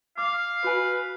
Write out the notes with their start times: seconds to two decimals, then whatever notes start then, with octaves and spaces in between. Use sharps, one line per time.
0.18 F5 D6
0.64 F#4 B4 G#5